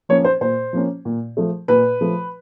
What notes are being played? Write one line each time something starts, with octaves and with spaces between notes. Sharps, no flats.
F3 A#3 C#4 C#5
C5
A#2 C5
F3 A#3 C#4
A#2
F3 A3
A#2 B4
F3 A3